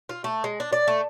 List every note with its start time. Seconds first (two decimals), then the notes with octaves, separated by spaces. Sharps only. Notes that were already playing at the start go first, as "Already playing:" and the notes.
0.09 F4
0.24 A3
0.44 G#3
0.60 D4
0.73 D5
0.88 A3